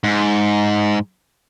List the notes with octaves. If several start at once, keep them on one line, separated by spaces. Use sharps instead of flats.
G#2